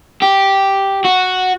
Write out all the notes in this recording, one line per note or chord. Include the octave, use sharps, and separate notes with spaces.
G4
F#4